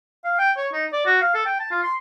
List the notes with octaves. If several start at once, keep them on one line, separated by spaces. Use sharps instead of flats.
F5
G5
C#5
D#4
D5
F#4
F5
A4
G5
A5
F4
C6